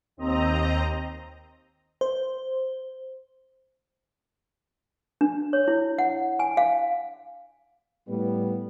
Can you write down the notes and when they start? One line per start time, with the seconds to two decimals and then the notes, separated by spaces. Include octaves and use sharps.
0.17 D#2 C4 D#5 A#5
2.01 C5
5.21 D4
5.53 C#5
5.68 E4
5.98 F#5
6.39 G#5
6.57 F5
8.09 A2 G3 B3